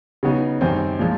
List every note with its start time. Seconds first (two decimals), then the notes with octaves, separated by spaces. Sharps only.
0.23 C#3 F#3 B3 D#4
0.61 F#2 D#3 G3 C4 D#4
0.99 A#2 F3 G#3